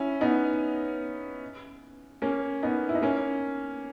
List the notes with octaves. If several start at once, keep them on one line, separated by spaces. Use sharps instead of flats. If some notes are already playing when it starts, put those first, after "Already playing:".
Already playing: C#4 E4
B3 D#4
A#3 C#4
B3 D#4
E4
D#4
A#3 C#4